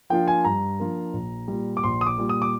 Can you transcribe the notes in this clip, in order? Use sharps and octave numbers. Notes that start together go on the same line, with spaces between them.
F3 A#3 D4 F4 G5
G#5
G2 A#5
F3 A#3 D4 F4
A#1
A#2 G3
D6
A#1 C6
D#6
D6
A#2 G3
D#6
D6